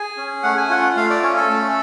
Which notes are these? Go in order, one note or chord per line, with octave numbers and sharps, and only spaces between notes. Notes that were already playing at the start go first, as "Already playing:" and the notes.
Already playing: G#4 G#5
C#4
A3 F#5
G#5
F4 F#5
A3 F5
D5
C#4 C#5
A4
A3